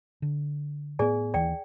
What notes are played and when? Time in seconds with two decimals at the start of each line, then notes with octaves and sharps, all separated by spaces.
0.22 D3
0.99 A2 B3 G#4 D5 G#5
1.34 D#2 E3 D5 G5